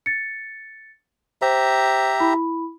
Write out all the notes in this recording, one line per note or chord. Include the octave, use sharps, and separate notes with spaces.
A6 C#7
G4 C5 E5 A#5
E4 B5